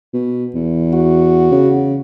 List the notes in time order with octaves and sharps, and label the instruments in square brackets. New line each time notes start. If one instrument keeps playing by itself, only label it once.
[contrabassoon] B2
E2
[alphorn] F#4
[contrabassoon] C#3